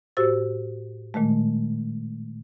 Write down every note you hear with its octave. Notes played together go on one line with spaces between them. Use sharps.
A2 F#4 G4 C5 E6 A6
A#2 D#3 G#3 A3